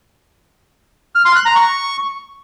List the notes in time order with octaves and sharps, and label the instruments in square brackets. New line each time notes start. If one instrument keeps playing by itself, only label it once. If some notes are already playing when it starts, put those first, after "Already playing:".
[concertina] F6
C6
F#6
A#5
C#6